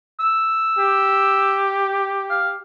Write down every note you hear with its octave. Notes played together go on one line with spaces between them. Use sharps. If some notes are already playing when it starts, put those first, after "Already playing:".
E6
G4
F5